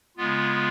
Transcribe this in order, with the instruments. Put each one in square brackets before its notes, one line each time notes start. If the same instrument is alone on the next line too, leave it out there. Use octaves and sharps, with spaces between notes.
[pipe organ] C#3 G#3 B3 F4